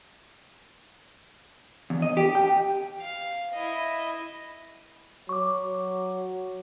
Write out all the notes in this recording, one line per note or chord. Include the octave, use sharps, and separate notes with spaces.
E2
D#5
G4
G5
F5
E4 D#5
F#3 C#6 D6